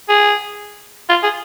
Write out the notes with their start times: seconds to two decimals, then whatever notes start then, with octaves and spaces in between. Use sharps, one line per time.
0.09 G#4
1.10 F4
1.24 G#4